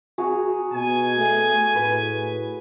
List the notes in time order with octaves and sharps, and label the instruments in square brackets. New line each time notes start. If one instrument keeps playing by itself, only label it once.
[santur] F#4 G#4 A#5
[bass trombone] B2 [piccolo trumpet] G#5
[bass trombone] A3
[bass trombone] A2 [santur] B4